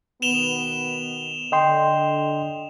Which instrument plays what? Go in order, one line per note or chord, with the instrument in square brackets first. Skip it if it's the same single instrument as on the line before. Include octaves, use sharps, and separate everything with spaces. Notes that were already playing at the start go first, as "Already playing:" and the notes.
[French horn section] B2 D#3 B3 [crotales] E7 F7 G7
[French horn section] D3 [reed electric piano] D#5 G5 C6